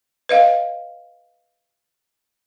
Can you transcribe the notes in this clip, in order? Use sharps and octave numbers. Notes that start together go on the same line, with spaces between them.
B4 D#5 F5